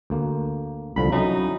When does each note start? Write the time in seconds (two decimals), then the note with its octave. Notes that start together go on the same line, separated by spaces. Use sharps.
0.10 D2 A#3
0.96 C2 D3 F3 B5
1.12 F#3 C#4 D#4 E4